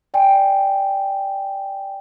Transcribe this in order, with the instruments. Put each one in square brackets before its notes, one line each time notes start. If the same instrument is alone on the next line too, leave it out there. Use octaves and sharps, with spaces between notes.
[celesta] D5 G5 G#5